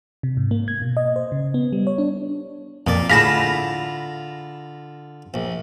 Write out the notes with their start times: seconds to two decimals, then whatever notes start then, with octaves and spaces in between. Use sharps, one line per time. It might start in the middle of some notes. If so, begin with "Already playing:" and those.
0.23 C3
0.37 G#2
0.51 A#3
0.68 G#6
0.82 B2
0.97 D#5
1.16 C5
1.32 C#3
1.54 B3
1.73 G3
1.87 C#5
1.98 D4
2.87 F2 A#2 D5
3.10 A2 D3 F4 G#4 F5 B5 A#6 E7
5.34 A#1